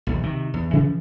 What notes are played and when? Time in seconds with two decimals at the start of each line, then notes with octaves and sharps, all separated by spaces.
0.07 B1 E2
0.23 C3 D#3
0.54 E2
0.73 C#3 E3 F3